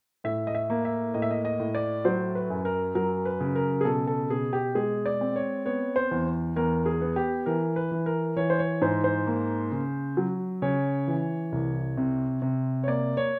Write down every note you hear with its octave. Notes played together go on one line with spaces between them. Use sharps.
A2 E5
D#5
E5
A#3
E5
A2 D#5
E5
D#5
D#5
A2
D5
F#3 C5
B4
F#2
A#4
F#3 A#4
B4
C#3
A#4
G#4
B2 A4
A4
B2 G#4
G4
G#3 G#4
D5
C4
C#5
B3 C#5
C5
E2
E2 A#4
G#4
B3
G4
E3 A#4
B4
E3
A#4
E3 C#5
C5
C#5
G#2 C5
C5
A#3
C#3
F#3
C#3 C#5
E3
C2
C3
C3
C#5
A#3 D5
C#5